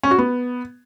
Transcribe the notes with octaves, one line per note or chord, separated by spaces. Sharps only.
C#4
F#4
B3